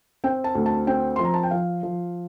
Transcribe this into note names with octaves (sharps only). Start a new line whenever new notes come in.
C4 G5
A5
D2
A5
C4 G5
F3 C6
A#5
A5
G5
F3 F5
F3